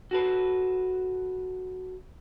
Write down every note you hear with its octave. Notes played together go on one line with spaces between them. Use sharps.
F#4 A4 B4